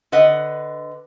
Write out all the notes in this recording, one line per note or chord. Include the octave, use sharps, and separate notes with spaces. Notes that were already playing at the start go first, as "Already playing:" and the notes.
D3 B4 D#5 F#5